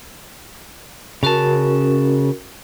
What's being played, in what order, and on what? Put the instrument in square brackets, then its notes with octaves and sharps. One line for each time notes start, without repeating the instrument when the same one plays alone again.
[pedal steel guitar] C#3 A5 [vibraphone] C#4 F#4 A#4